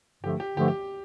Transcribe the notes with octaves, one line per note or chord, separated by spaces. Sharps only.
G2 D3 F3 A3 G4
G4
G2 D3 F3 A3 G4
G4